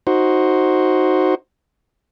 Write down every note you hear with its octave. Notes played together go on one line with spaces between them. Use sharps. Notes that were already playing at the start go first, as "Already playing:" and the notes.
D#4 F#4 C5